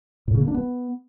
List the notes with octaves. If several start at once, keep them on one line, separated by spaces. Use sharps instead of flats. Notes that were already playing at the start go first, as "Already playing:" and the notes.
A2
C#3
A#3
D4
B3